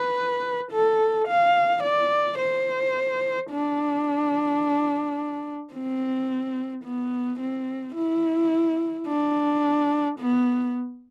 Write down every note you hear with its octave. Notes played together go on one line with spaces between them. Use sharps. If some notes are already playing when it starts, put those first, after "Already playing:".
Already playing: B4
A4
F5
D5
C5
D4
C4
B3
C4
E4
D4
B3